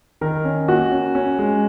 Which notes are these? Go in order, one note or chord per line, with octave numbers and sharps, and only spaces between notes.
D#3 A#4
C#4
A#3 F#4
C#4
C#4
G#3